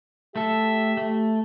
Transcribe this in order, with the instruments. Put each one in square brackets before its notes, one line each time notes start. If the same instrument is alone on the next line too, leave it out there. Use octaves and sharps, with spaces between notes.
[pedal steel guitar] A3 A4 [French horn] G4 [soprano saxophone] E5
[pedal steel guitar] A3